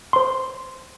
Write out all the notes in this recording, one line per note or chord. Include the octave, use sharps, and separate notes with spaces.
C5 C6